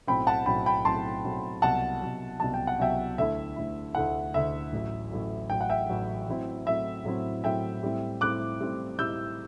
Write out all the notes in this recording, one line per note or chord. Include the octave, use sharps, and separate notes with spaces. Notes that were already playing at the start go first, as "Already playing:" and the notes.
B1 A2 F#3 C4 G5 B5
F#5 A5
B1 A2 F#3 C4 G5 B5
G5 B5
B1 A2 F#3 C4 A5 C6
B1 A2 F#3 C4
C2 B2 F#3 F#5 A5
C2 B2 F#3
C2 B2 F#3 A5
G5
F#5
C2 B2 F#3 E5 G5
D2 D3 A3 E4 E5
D2 D3 A3 E4
D2 D3 A3 E4 F#5
D2 D3 A3 E4 E5
A1 A2 F#3
A1 A2 F#3
A1 A2 F#3 G5
F#5
E5 G5
A1 A2 F#3
A2 F#3 C4 E4
A2 F#3 C4 E4 E5
A2 F#3 C4 E4
A2 F#3 C4 E4 E5 G5
A2 G3 C4 E4
A2 G3 C4 E4 D6 F#6
A2 G3 C4 E4
A2 G3 C4 E4 E6 G6